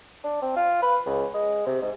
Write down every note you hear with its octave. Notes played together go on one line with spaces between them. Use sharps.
D4
C4
F4
B4
C#2
G#3
C3
G#2